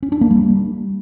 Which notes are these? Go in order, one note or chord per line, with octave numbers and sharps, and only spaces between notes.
C#4
D4
A#3
G3